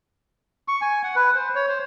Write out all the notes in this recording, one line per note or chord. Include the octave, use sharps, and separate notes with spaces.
C#6
G#5
F#5
B4
C5
C#5
C5